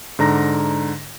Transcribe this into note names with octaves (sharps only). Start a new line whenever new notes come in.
G#2 D3 A#5 A#6